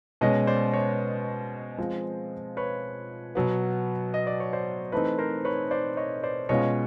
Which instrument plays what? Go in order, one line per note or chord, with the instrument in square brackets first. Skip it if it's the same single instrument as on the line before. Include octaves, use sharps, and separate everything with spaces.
[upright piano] B2 G#3 C#4 [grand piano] C#5 D#5
[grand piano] C5 D5
C#5 D#5
[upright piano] F3 G#3 C4
[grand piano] B4 C#5
[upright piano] B2 F#3 B3
[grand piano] D#5
D5
C#5
C5 D5
[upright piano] E3 A3 C4 D#4 [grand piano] B4
[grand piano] A#4 C5
B4 C#5
C5 D5
C#5 D#5
C5 D5
[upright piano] B2 G#3 C#4 F4 [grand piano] C#5 D#5